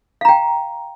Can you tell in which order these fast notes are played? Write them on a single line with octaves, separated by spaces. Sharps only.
F5 A#5 G5